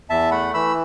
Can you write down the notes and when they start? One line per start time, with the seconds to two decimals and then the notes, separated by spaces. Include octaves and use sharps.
0.09 E2 E5 A5
0.31 A3 F#5 B5
0.54 E3 B5 E6